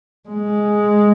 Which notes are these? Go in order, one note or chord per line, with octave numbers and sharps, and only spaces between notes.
G#3